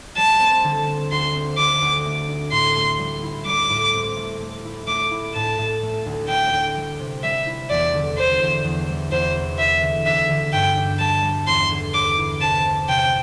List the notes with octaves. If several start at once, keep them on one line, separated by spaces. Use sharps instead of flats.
G3 A5
C4
D3
C4
D2 C6
C4
D3 D6
D2
A3
D4
A2 C6
A3
G3
E4
G3 D6
A2
C4
A3
A3
E4
A3 D6
E4
A2 A5
A2
A3
D2
A3 G5
D2
G3
C3
G3 E5
E4
E2 D5
D3
D3 C5
E2
E2
G3
E2 C5
C3
E4 E5
D3
D2 E5
D3
G2 G5
D4
G3 A5
G3
E2 C6
D3
D3 D6
E4
C3 A5
C3
C3 G5